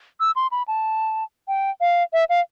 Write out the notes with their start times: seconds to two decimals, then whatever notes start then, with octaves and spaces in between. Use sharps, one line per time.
0.20 E6
0.36 C6
0.52 B5
0.68 A5
1.48 G5
1.81 F5
2.13 E5
2.29 F5